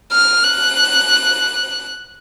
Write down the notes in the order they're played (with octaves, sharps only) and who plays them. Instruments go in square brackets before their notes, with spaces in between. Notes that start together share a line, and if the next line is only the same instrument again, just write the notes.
[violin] F6
F#6